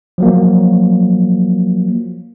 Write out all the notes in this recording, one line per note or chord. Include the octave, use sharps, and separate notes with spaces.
F3 F#3 A#3